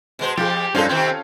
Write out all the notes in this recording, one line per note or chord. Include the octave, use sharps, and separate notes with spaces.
B2 G#3 C5
F2 F3 F4 G4 G#4
G2 F3 C#4 D#4 F4 A4 C5
C3 D#3 B3 C4